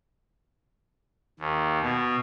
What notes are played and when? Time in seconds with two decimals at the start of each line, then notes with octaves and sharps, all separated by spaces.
1.40 D#2
1.82 B2